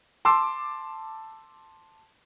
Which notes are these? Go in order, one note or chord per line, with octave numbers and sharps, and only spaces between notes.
A5 C6 D6 E6